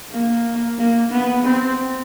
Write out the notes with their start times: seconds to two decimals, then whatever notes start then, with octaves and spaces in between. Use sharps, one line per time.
0.11 A#3
0.78 A#3
1.11 B3
1.45 C4